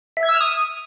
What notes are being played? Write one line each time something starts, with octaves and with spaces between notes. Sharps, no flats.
E5
G#6
E6
F6
D#6